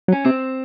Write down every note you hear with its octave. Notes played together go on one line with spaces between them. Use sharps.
F#3
C#4
C3 C4